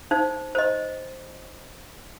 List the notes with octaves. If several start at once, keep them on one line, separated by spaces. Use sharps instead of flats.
D#4 C5
C5 D#5